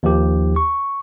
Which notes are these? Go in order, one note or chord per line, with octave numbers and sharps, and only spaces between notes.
D#2 F3 G4
C#6